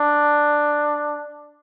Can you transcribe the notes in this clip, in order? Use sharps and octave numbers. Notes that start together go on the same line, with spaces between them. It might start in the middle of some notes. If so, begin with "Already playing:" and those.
Already playing: D4